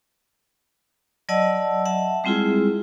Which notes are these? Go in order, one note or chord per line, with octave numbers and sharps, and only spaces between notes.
F#3 D5 D#5 F#5 A5 E6
E5 F#5 A5
G3 G#3 C4 E4 F4 G#4